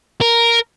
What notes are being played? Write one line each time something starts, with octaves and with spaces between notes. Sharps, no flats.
A#4